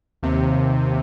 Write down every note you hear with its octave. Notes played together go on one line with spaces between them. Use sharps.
D#2 C3